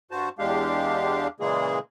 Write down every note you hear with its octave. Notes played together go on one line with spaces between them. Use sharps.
G2 F#4 C5 A5
E2 G#3 D4 G4 F5
A#2 C#3 E3 G#3 A#3 G#4